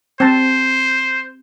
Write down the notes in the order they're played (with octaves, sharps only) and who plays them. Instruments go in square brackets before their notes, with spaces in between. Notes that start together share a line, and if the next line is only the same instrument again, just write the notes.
[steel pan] C4 A5 [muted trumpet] C5